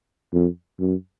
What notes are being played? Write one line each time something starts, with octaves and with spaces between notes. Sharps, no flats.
F2
F#2